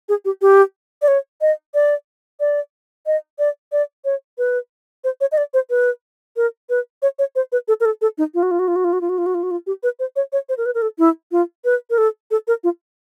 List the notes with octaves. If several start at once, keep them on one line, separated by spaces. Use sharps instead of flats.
G#4
G4
G4
D5
C#5
D#5
D5
D5
D#5
D5
D5
C#5
B4
C5
C#5
D#5
D5
C5
B4
A#4
B4
C#5
C#5
C5
B4
A4
A#4
A4
A4
D#4
F4
F#4
F4
F#4
F4
F#4
F4
F#4
F4
F#4
F4
F#4
F4
F#4
F4
G4
B4
C5
C#5
C#5
C5
A#4
B4
A#4
A4
E4
F4
B4
A#4
A4
A4
A#4
F4